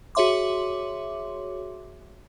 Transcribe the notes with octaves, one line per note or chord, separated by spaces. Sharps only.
F#4 G#4 C#5 E5 C6 D6